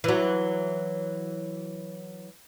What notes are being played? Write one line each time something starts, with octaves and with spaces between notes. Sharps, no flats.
E3 F#3